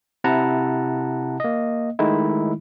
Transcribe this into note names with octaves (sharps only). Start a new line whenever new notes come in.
C3 E4 F#5 A5 A#5
A#3 D#5
D#3 G#3 A3 D#4 E4